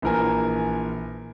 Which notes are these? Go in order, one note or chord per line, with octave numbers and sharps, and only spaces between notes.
A#1 E3 A#4 G#5